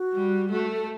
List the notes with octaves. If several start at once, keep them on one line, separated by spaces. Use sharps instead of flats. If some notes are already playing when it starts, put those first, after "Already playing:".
Already playing: F#4
G3
A3 F#4
A4